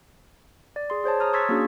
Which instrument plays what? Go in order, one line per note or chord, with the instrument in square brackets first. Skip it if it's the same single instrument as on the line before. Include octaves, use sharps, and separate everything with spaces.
[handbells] D5
G#4 C6
G#4 C5 C#5 A5
C#5 A#5 D#6 F6
C6 C#6 E6 G#6 A6 B6
A#3 C#4 D4 F#4 G#4